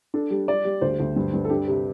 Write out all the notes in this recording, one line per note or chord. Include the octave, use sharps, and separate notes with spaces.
D4 A4
G3
G3 D5
G3
D2 C5
D2
G2
G2
A4
D4 G4
C3